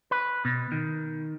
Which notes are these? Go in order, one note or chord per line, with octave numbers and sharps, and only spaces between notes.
B4
B2
D#3